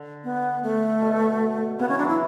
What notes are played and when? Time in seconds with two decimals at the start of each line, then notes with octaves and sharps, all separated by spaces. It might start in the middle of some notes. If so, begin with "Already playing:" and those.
Already playing: D3
0.24 B3
0.63 A3
1.01 B2
1.79 C#3 B3
1.88 E3 C#4
1.99 F#3 D4
2.08 E3 E4